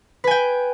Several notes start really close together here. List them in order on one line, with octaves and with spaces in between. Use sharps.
B4 G#5 G5